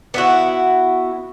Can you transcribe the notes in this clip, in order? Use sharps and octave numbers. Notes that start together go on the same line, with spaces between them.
B3 E4 F#4